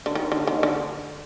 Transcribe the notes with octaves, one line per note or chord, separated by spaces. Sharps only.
D3
D#3
D3
D#3
D3